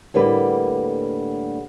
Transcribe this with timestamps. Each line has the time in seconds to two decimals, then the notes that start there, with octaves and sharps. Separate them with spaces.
0.14 A2 D3 G3 A#3 B4